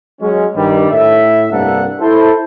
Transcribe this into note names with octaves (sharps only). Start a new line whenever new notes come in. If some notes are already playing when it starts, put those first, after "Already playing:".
F#3 G#3 C#4
G2 D#3 G3
A2 E5
C2 G2 A#3 D4 A4 F#5
E4 A4 C5